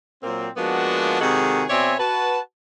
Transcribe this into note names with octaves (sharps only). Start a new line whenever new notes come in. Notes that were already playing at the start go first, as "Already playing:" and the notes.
A#2 F#3 A#3 C4
F3 G#3 A#3 B3 D4 F#4
C3 D#3 G#3 F#4 G#4 A4
B2 C4 C#5 D5 E5 G#5
F#4 B4 A5